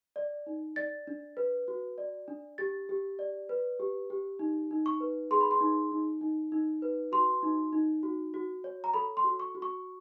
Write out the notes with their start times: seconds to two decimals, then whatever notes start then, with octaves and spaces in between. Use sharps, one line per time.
0.16 D5
0.47 D#4
0.76 D5 A6
1.07 D4
1.37 B4
1.68 F#4
1.98 D5
2.28 D4
2.58 G4 A6
2.89 G4
3.19 D5
3.49 B4
3.80 G4
4.10 G4
4.39 D#4
4.71 D#4
4.86 C#6
5.00 B4
5.31 G#4 C6
5.41 B5
5.51 C6
5.61 D#4
5.91 D#4
6.21 D#4
6.52 D#4
6.82 B4
7.12 F#4 C6
7.43 D#4
7.73 D#4
8.03 F#4
8.34 F#4
8.64 C#5
8.84 A#5
8.94 A4 B5
9.17 C6
9.24 F#4
9.40 C#6
9.55 F#4
9.62 C#6